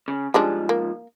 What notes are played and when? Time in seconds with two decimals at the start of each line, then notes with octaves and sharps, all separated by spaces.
0.08 C#3
0.34 G#2 F3 G3 G#3 D4
0.69 A#3